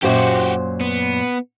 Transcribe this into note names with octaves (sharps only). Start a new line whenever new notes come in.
F#2 A#2 F#4 G4 C5
B3